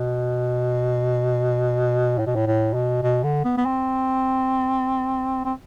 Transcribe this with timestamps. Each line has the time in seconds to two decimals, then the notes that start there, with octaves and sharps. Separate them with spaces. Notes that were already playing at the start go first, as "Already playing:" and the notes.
Already playing: B2
2.19 A2
2.26 B2
2.36 A2
2.47 A2
2.74 B2
3.03 B2
3.24 D3
3.45 B3
3.57 B3
3.65 C4
5.45 C4